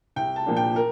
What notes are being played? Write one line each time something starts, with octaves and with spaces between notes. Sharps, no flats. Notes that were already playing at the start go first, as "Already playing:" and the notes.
C2 G5
A5
A#2 F3 A#3 D4
G5
A#4